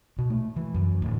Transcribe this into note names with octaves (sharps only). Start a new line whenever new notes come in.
B2
A3
E3
F#2
D1